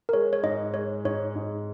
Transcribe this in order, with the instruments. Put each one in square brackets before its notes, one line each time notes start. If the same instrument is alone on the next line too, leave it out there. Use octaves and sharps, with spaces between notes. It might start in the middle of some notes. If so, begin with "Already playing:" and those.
[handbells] A#4
[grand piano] G#3 [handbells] C#5
[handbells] C#5
[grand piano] G#2 [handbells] D#5
[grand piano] G#3 [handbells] C#5
[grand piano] G#2 [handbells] C#5
[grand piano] G#2